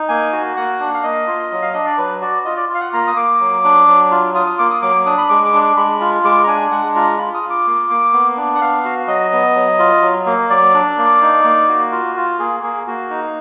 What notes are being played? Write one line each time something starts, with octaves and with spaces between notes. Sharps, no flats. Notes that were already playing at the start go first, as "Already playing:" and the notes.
Already playing: D#4
A#3 G#5
F#4
A#3 F#5
D4
F5
A#3 D#5
F4
F#3
F5
D4 D#5
D5
F#3 B4
F#4 D5
F4 D#5
D5
F4
F5
F#5
A#3 A#5
D#6
A#3 D6
F#3
D4
F#3
F4
F4 D#6
D#6
A#3 D6
D#6
F#3 D6
D4 D#6
B5
G#3 D6
D6
D4
D6
G#3 B5
F4
G#3 D6
A#5
D4 G#5
G#3 F#5
F4 A#5
F4 B5
D#6
F4
D6
A#3
A#3
B3
D4
F#5
B3 F5
F#4
F#3 D#5
B3
F#3
F4
F#3
A#3
F#3 D5
D4
A#3
D#4
A#3
F#4
F4
F4
A#3 G#4
A#3 G#4
A#3 F#4
D#4